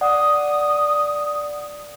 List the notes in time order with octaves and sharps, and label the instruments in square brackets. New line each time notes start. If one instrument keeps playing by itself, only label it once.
[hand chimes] D5 F#5 [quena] D#6